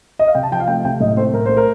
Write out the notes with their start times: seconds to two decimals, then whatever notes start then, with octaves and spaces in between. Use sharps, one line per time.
0.19 D#5
0.27 F5
0.35 C3 G5
0.43 A5
0.51 F3 G5
0.60 F5
0.68 A3 G5
0.85 C3 G5
1.00 A2 D#5
1.17 A3 C5
1.33 A2 A#4
1.46 A3 C5
1.57 A#4